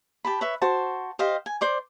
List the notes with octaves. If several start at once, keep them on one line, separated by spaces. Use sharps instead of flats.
G4 A5 B5
B4 C#5 E5
F#4 C5 A5
G4 C5 D#5 F5
G#5
C5 D5 D6